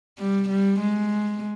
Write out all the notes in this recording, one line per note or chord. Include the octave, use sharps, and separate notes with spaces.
G3
G3
G#3